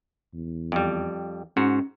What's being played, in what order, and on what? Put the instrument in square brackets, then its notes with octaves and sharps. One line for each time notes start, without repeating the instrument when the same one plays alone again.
[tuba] E2
[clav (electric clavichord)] F2 G3
[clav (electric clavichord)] G#2 F#4 [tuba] C#4